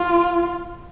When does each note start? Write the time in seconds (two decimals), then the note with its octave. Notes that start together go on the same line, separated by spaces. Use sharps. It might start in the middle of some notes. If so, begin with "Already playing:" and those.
Already playing: F4